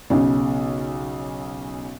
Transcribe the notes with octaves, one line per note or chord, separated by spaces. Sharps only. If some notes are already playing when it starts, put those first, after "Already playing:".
B1 C#3